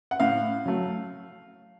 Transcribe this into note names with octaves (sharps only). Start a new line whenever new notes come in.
F#5
A2 F5
F#3 A3